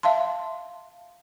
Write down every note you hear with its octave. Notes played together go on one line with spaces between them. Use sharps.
E5 F5 A5 C6